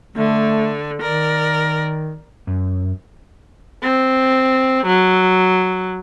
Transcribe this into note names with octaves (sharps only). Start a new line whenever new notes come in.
D3 A3
D#3 A#4 D5
F#2
C4
F#3